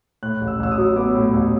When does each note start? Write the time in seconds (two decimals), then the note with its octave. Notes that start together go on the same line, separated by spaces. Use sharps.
0.23 A2 F#6
0.41 A1
0.48 E6
0.60 A1 E6
0.72 D#6
0.78 F#3
0.96 B3 D6
1.15 A2
1.33 A1